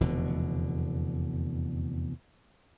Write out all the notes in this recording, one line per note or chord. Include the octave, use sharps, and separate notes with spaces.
F1 E2 B2 D3